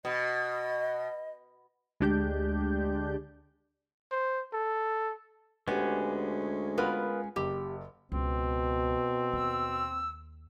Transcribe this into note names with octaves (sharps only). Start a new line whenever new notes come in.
B2 D#5
D2 G#3 D4 G4 G6
C5
A4
D2 G#3 B3 C#4 G4
B3 F4 A#4 B4
F#1 G4
C#2 B2 C4
D#2 E6